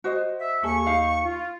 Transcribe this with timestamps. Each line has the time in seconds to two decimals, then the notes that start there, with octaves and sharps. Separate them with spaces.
0.04 F#4 C5 D#5
0.40 E5
0.64 D#2 G#4 A4 C#6
0.87 D#4 F5
1.24 F4